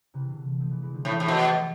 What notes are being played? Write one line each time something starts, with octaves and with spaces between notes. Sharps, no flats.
C3 E3
B2 D3
F3 A3
E3 G#3
E3 G#3
D3 F3
A2 E3 G#3
A2
B2
F3 A3